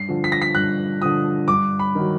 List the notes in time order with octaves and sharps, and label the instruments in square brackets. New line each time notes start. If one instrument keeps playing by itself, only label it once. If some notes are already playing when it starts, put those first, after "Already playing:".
Already playing: [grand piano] G2 C7
D3 F3
B6
A#6
B6
G2 F#6
D3 F3 D#6
G2 D6
B5
D#3 F#3